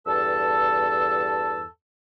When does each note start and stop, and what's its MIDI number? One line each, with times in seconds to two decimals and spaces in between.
0.07 1.66 40
0.07 1.66 43
0.07 1.66 69
0.07 1.66 81
0.07 1.66 88